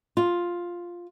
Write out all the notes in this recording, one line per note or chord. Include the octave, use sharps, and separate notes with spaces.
F4